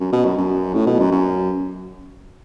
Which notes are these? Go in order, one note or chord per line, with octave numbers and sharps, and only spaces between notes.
F#2
B2
F#2
F#2
A2
B2
F#2
F#2